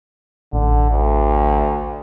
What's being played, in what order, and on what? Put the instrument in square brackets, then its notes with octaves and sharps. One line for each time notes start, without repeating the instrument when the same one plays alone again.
[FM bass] A1 [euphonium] D3
[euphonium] D2